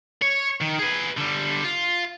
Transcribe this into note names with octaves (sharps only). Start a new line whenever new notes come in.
C#5
D#3
G#4 B4
D3 G3
F4